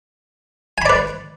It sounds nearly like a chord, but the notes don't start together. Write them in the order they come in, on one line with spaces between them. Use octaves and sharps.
G#5 B5 D5 B4